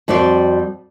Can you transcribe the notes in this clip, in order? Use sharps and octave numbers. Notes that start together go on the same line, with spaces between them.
F2 G3 F#4 C5 D5